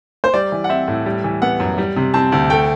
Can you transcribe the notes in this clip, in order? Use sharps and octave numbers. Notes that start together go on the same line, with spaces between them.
C5
G3 D5
E3
F#5
C4 E5
A2
G3
E3
B3 F#5
F#2
G3
C3
C4 A5
D2
A3 G5